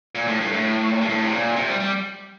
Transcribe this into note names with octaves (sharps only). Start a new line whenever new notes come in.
A#2
A2
G2
A2
G2
A2
C3
A#2
C3
G3
G3